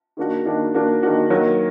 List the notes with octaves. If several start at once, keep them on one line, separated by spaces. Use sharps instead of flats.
D#3 A#3 D4 F#4
D#3 A#3 D4 F#4
D#3 A#3 D4 F#4
D#3 A#3 D4 F#4
D#3 F#3 A#3